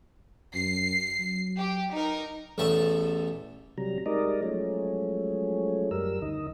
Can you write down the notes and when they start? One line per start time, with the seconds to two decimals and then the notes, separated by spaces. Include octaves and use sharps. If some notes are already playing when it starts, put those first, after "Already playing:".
0.55 F#2 C7
1.20 F#3
1.58 G4
1.92 D#4 A#4
2.58 A1 E2 A3 A5
3.78 C3 F#3 G3 A#5
4.06 G3 G#3 D#4 A#4 D5 D#5
4.43 F3 F#3 G#3 A3 C#4
5.91 F#2 G3 A#4 E6
6.22 D2 D#3 D#5